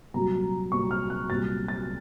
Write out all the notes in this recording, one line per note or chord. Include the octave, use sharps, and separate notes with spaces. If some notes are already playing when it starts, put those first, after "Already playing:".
C2 A#2 F#3 A#5
C2 A#2 F#3 C#6
F6
F#6
C2 A#2 F#3 A6
A6